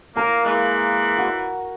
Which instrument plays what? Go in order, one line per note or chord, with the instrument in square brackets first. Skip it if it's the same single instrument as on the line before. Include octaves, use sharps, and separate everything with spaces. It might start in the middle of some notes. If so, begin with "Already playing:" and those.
[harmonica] A#3 [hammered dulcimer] A#4 F5
[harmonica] E3 [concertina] G#3 A#3 F#6
[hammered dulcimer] F#4